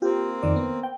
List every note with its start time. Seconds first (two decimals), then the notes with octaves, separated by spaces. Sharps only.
0.02 A#3 C4 F4 G4
0.43 F2 D#3 D5
0.56 B3
0.83 G5